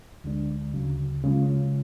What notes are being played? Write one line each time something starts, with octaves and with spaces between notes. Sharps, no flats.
D2 D3 G#3 D4
D2 C#3 F#3
C#3 G#3 C#4 F4